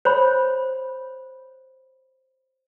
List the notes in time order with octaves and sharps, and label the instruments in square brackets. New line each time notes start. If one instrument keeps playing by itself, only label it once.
[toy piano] C5 C#5 B5